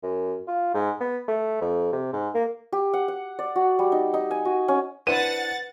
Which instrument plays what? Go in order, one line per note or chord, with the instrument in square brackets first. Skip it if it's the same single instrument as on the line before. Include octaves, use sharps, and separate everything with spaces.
[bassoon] F#2
F4
G#2
B3
A3
F2
C3
G#2
A#3
[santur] G4
F#5
F#5
D5
F#4
G3
D#4
D#4
G#5
F#4
C#4
[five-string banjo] D4 E4 C5 [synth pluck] B4 E7 [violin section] F#5 A6 [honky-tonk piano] D#7